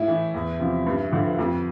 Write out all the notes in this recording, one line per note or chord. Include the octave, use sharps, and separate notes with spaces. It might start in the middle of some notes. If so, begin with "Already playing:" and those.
Already playing: A2 E4
E3
E2
C3 F3
G2
D3 F3
F2